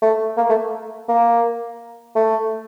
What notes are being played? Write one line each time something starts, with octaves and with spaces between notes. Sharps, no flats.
A3
A#3
A3
A#3
A3